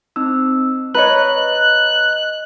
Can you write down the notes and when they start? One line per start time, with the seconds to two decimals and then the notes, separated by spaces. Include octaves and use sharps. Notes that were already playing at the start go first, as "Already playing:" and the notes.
0.16 C4 D#4 E6
0.94 B4 C#5 D#5 A#5 F#6